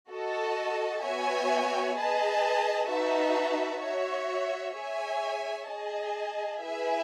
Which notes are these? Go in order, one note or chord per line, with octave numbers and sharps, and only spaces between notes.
F#4 A4 D#5 A5
B3 F#4 C#5 E5 G#5
G#4 B4 D#5 A5
D#4 F#4 B4 E5 A5
F#4 C#5 E5
G#4 C#5 E5 G#5
G#4 D#5 A5
E4 G#4 B4 E5 G#5